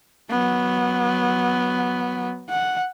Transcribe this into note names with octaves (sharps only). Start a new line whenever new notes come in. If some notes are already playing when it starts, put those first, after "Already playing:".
F#3 B3
F#5